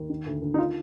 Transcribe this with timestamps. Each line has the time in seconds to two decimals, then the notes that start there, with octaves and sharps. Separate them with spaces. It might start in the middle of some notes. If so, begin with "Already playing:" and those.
Already playing: D#2
0.10 D#3
0.26 D2
0.42 D2
0.54 D#4
0.58 F4